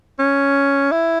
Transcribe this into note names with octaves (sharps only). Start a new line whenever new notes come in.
C#4
E4